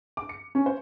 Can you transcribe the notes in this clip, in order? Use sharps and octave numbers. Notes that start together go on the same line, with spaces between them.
D6
C#7
C#4
C5